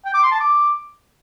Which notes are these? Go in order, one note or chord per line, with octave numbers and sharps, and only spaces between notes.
G5
D6
C6
A5
D6